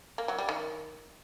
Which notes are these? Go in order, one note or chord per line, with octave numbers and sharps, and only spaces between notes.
A#3
F#3
G3
D#3